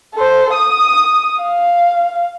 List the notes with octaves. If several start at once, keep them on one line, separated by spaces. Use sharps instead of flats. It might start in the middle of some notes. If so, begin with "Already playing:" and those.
A4 C5
D#6
F5